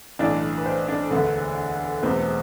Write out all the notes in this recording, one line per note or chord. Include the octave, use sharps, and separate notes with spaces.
B1 A2 E3 D4 D5
B4
C5
D4 D5
E1 D2 D3 B4
E1 E2 B2 A3 C4 B4